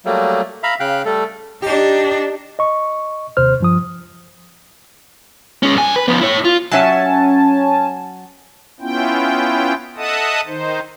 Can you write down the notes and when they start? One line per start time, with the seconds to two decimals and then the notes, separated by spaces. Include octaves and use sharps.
0.05 F#3 G3 A3 A#3
0.63 E5 F5 A#5 B5
0.80 C#3 F5 G5 F#6
1.05 G3 A3 A4
1.62 D4 D#4 G4
2.59 D#5 C#6
3.37 D#2 C3 C5 F6
3.60 G2 F3 D#6
5.63 G#3 C#4
5.76 G2 G#5
5.96 B4
6.08 F3 B3
6.21 E4 C#5
6.45 F4
6.71 F#3 C#4 E5 F#5 G#5 A5
8.80 B3 C#4 E4 F4 G5
9.96 A4 D#5 E5 F#5 A5 D#6
10.47 D#3 D#4 C5